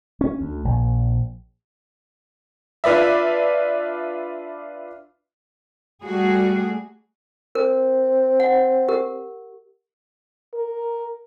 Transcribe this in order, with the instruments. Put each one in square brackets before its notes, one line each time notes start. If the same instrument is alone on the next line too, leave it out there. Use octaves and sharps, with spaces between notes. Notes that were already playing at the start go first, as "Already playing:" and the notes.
[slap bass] C#4
D2
A#1
[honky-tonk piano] D4 F4 B4 D5 E5
[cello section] G3 A3 F#4 G#4
[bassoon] C4 [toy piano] A#4
[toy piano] F#5
G4 A#4
[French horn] A#4